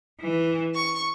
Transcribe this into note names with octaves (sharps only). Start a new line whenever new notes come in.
E3
C#6